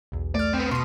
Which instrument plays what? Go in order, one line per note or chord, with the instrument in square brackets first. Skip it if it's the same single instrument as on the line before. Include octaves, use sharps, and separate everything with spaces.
[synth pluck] B1 E2
[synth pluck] A3 F6 [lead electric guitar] D5
[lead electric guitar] B3 C4
[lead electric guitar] B2 [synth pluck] C6 D#6